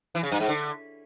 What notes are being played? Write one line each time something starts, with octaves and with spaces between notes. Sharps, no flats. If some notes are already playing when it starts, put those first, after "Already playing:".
E3
C#3
G2
G#2
D3